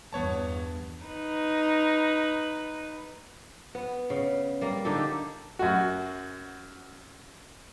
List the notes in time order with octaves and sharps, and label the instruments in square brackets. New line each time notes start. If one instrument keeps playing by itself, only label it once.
[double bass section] E2 G2 [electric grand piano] B3 C#5 A5
[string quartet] D#4 B4
[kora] B3
C#3
G3 A#3
D3 D#4 G4 A4
[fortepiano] F#2 F#4